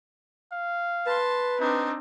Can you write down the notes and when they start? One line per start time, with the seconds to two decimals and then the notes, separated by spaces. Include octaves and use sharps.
0.52 F5
1.06 B4 A5 C6
1.60 C4 D4 D#4